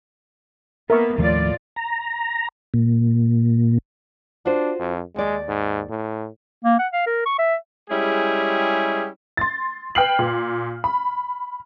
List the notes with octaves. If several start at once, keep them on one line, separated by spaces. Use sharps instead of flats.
A#3 B3 A#4 E5 C#6
D#2 A2 F3 A3 F4 D5
A#5
A#2
D4 F4 F#4 C5
F2
D#2 G#3 D5
G#2
A2
A#3
F#5
F5
A#4
C#6
E5
G3 G#3 C#4 E4 G4 G#4
C6 A6
B4 G5 F6 C7 F#7
A#2
B5